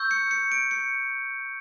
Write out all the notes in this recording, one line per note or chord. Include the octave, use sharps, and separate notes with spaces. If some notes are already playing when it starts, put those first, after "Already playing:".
Already playing: C#6 E6 G6
C#7
C#7
D7
C#7